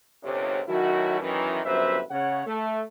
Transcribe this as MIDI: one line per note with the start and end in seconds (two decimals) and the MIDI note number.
0.24 0.61 31
0.24 0.61 37
0.24 0.61 48
0.24 0.61 73
0.68 1.19 51
0.68 1.19 54
0.68 1.19 57
0.68 1.19 61
0.68 1.19 64
0.68 1.19 66
1.21 1.60 42
1.21 1.60 51
1.21 1.60 52
1.65 2.00 31
1.65 2.00 42
1.65 2.00 46
1.65 2.00 71
1.65 2.00 72
1.65 2.00 76
2.11 2.44 49
2.11 2.44 73
2.11 2.44 78
2.46 2.82 57